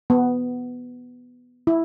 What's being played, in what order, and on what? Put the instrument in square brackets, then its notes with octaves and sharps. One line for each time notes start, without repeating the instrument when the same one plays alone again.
[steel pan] B3
E4